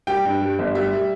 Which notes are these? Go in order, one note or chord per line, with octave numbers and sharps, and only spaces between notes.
G3 G5
G2
G3
G1
G3 E5
G3